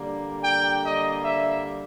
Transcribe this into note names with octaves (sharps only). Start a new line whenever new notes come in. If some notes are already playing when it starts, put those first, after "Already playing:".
Already playing: D3 G3 A#3
G5
D#5
E5